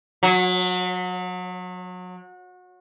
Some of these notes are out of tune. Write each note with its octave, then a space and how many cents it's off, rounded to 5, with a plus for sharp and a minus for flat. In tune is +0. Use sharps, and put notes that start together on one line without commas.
F#3 -30